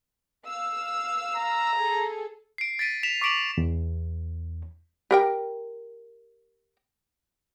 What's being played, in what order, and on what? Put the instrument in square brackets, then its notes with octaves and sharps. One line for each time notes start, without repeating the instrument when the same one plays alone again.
[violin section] F5 E6
[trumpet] A#5
[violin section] G#4 A4
[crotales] C7 D7
A6 B6 D7 D#7
B6 E7 F7
C#6 D6 B6 D7 F7 F#7
[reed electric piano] E2
[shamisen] G4 A#4 G5